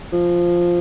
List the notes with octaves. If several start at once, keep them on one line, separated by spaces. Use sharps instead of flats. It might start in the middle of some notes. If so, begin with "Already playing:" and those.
F3